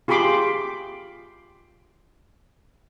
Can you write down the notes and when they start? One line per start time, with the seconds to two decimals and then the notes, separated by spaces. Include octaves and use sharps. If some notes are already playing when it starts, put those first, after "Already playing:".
0.08 F4 G4 G#4 B5 C6 D6